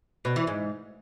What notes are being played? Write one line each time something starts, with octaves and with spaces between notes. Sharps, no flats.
B2
E3
G#2